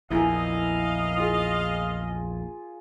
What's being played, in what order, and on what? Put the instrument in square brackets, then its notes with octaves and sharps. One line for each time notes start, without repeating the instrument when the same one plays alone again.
[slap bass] A#1 E2 [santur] E4 A#4 G#5 [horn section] D#5 F5
[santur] F4 G#4